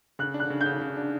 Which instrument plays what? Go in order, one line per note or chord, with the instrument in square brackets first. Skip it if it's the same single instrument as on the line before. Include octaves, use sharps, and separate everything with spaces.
[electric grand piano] C#3 [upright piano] F#6
[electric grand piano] D4
[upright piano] F#6
[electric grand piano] C#3
[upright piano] G6
[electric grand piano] C#3
C#3
D4